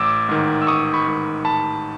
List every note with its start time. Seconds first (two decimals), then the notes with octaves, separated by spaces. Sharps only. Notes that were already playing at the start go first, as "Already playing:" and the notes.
Already playing: A1 D6 E6
0.29 G#2 D#3
0.62 E6
0.67 A1 C#6 D#6
0.94 B5 C#6
1.07 G#2 D#3
1.45 A1 A5 B5